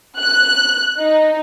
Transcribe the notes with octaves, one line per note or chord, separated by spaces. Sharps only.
F#6
D#4